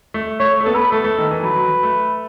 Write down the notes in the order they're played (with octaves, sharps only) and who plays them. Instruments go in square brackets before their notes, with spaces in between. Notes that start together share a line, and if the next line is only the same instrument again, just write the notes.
[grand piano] A3
[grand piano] A3 [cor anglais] C#5
[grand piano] A3
[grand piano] B3 [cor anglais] A4
[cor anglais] B4
[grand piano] A3 [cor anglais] A4
[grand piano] A3
D#3
E3
[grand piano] F#3 [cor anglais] B4
[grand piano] F#3
A3